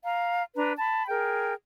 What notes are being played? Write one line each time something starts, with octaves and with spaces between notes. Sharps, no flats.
F5 A#5
D4 B4 A#5
A5 B5
G#4 A#4 G5